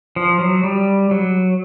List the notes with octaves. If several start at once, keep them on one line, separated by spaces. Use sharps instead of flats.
F3
F#3
G3
F#3